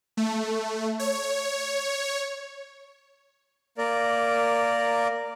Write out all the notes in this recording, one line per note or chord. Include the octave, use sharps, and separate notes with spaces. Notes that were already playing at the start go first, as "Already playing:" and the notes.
A3
C#5
A#3 A#4 D5